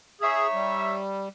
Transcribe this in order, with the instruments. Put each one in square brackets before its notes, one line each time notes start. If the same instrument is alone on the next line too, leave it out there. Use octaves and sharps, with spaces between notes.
[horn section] D#4 C#5 E5 [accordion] G#4
[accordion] G3